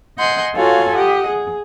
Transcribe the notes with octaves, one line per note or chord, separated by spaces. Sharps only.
D#5 F#5 G#5 C6 G6
F4 F#4 A4 C#5 F5 G#5
G4 D#5 F#5
G#4